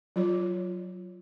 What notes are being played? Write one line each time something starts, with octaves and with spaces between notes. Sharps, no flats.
F#3 F4 C#5